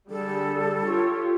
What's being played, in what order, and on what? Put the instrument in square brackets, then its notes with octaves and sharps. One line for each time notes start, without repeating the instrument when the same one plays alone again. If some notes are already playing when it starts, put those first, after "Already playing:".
[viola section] D3 G3 G#4 [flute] A4
[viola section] F4 G4 C#5